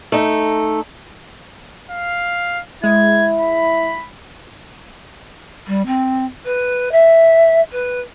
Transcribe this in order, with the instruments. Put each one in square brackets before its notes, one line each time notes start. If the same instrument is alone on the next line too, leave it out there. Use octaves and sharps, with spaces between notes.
[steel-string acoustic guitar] A3 D#4
[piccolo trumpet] F5
[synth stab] G#3 [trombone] E4 [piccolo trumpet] G#6
[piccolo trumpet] B5
[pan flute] G3
C4
B4
E5
B4